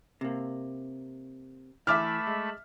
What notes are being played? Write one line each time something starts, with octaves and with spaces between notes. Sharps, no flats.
C3 A#3
E3 A3 E5 A5 B5 D6 F6
G#3